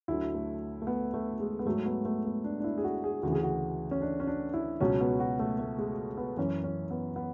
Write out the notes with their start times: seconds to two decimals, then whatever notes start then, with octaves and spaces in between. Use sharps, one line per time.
0.08 D2 D3 F#3 E4
0.34 A3
0.82 A3
0.87 B3
1.14 A3
1.40 G#3
1.59 B3
1.65 G#2 F#3 A3
1.86 B3
2.05 A3
2.25 B3
2.44 D4
2.60 D4
2.64 E4
2.78 G#4
2.84 F#4
3.04 G#4
3.23 D2 C#3 E3 F#4
3.33 G#4
3.43 F#4
3.91 C#4
4.02 D4
4.20 C#4
4.27 D4
4.54 E4
4.81 C#2 B2 F#3 C#4
5.01 B3
5.20 F#4
5.39 A3
5.59 A3
5.79 G#3
6.17 B3
6.37 F#2 E3 C#4
6.64 C#4
6.91 B3
7.16 B3